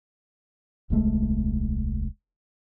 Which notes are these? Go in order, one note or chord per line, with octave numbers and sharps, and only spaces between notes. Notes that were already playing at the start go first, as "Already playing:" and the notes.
D#1 C2 G#3 A3